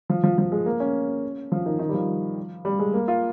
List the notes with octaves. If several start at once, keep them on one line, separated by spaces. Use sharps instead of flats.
F3
F3
F3
G#3
A#3
C#4
F3
D#3
D#3
G3
F3
G3
G#3
A#3
F4